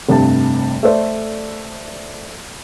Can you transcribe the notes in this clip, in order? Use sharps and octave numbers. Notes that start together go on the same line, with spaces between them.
F1 G2 C3 A5
A3 A4 C5 D5